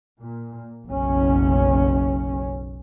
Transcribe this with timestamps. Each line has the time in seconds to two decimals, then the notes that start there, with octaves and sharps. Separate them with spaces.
0.20 A#2
0.86 F#1 B1 C#4